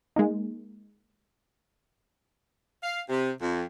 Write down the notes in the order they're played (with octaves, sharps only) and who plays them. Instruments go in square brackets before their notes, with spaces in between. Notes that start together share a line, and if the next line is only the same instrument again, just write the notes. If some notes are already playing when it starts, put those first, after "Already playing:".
[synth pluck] G#3 A#3 D#4
[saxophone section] F5
C3
F2